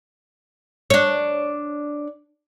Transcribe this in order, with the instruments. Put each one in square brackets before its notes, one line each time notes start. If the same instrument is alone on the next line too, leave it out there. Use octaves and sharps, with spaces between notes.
[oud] D4 C#5